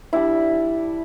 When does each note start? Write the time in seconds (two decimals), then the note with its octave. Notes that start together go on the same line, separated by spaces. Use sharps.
0.13 G3 D4 E4